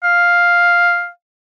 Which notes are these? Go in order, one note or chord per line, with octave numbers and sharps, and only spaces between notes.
F5